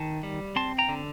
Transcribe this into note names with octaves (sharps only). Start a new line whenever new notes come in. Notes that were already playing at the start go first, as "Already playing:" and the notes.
Already playing: D#3 A5
G3
C4 A5 C6
G5 A#5
D3